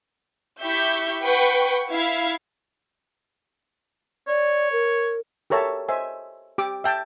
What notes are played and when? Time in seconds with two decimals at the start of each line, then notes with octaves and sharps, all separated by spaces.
0.61 E4 G4 E5 C#6 G6
1.22 B4 F#5 G5 C#6
1.90 E4 F5 G#6
4.28 C#5 D5
4.72 A#4
5.50 G4 A4 A#4 C#5 E5 A5
5.89 C5 D#5 E5 G#5
6.58 G4 D6 E6
6.84 E5 G5 A5